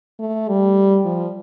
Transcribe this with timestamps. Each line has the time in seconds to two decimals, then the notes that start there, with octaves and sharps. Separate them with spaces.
0.20 A3
0.48 G3
1.05 F3